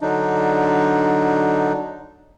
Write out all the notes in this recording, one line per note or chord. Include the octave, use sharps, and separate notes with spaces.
D3 F#3 D4 D#4